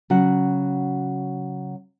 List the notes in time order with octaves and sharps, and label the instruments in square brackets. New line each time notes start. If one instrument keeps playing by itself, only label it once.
[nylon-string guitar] C#3 F#3 F#4 F#5